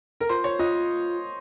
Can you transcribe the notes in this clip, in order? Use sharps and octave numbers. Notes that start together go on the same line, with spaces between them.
A#4
F4 C5
C#5
F4 D#5